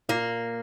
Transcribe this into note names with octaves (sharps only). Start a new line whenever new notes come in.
A#2 A#3